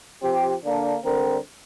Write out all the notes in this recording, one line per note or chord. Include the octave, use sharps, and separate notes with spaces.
F3 C4 G4
D3 A#3 D4
D3 G3 C4 A#4